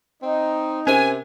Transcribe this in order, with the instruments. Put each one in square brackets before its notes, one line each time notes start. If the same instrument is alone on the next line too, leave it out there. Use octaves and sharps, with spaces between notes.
[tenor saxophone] C4 [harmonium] D#4
[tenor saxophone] C3 [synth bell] C#4 A#4 C5 [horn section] G#5